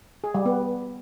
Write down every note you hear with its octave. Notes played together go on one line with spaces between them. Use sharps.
G#4
G3
B3